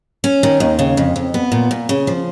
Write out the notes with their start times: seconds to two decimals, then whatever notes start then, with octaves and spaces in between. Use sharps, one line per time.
0.24 C#4
0.43 D#3
0.60 D#2
0.79 C#3
0.97 F2
1.16 F2
1.34 B3
1.52 A#2
1.71 A#2
1.89 C#3
2.07 F3